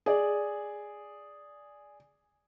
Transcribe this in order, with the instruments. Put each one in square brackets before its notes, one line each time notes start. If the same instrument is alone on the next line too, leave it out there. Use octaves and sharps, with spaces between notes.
[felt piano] G#4 D5